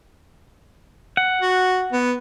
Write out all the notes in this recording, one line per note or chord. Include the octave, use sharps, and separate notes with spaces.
F#5
F#4
B3